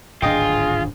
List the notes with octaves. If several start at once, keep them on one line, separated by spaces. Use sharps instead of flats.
D1 G#1 D4 F4 G#4 D#5 G5